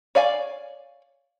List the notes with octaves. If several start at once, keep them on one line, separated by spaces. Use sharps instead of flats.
C#5 D5 F5 G#5